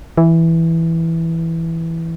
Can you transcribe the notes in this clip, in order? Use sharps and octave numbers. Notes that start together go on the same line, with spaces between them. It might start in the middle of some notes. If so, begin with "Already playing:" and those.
E3